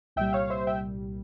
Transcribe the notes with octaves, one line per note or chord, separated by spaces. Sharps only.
C2 A#2 G3 E5 G5
C#5 F5
C5 E5
E5 G5